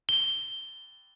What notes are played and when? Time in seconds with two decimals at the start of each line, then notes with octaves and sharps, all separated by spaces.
0.09 G7